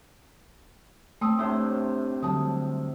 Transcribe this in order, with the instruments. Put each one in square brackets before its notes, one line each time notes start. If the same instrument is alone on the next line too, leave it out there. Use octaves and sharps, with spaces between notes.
[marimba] A3 D#6 E6 [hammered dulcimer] C4
[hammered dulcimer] A2 C3 [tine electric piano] D4 C#5 C6
[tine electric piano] D3 F#3 G3 [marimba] A5 D#6